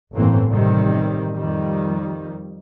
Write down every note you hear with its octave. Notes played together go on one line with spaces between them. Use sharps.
G1 F#2 A2 E3 A#3 C4
A1 F#2 C3 D#3 G3
F2 D#3 G3